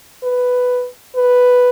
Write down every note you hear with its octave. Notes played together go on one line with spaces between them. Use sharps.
B4
B4